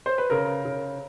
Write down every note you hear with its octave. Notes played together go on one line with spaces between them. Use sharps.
C5
B4
C#3 A#4
C#3